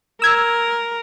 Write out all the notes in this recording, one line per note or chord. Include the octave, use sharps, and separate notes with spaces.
A#4 E6 G#6